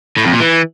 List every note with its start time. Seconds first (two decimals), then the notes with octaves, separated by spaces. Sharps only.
0.17 A2
0.25 F2
0.33 A#2
0.40 E3